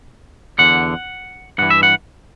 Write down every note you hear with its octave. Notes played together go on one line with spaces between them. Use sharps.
E2 D3 F#5
G2 E3 F#5
E5
F#5